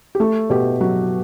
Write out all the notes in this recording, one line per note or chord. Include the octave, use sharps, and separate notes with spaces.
G4
A3 A4
B2 G4
F#3 F#4